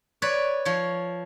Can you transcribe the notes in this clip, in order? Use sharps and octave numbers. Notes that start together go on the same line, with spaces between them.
B4 C#5 D5
F3 C#5